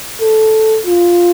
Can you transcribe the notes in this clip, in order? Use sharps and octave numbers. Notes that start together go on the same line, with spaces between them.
A4
F4